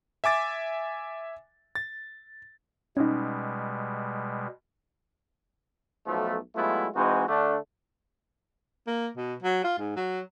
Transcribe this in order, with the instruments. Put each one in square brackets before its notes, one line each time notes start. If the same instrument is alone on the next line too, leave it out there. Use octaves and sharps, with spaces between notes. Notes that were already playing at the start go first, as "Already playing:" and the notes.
[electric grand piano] E5 G#5 D6 A6
A6
[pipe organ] B2 G3 G#3 [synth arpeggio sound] C#4 D#4
[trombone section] B1 F3 A3
F#3 G#3 A3 B3 E4 F4
E3 G#3 C4 D#4 F#4
D3 A3 D4
[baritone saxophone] A#3
B2
F#3
F4
G#2
F#3